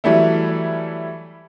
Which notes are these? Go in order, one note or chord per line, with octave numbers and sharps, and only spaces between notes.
E3 F#3 G3 A3 E4